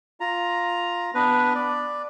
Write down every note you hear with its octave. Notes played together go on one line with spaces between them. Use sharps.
F4 A#5
B3 D4 B4
D5